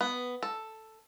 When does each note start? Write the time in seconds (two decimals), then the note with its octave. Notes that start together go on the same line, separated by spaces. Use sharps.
0.01 B3
0.43 A4